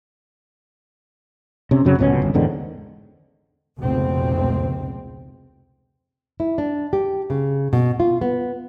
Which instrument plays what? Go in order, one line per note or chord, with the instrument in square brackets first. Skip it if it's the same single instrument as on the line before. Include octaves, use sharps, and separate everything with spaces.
[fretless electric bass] C3 C#4
F#2 C#3 F#3
D1 C#2 B2 C#4
G1
E2 G#2 D3 D#3
[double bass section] F1 C#2 B2 C4
[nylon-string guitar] E4
D4
G4
C#3
B2
F4
B3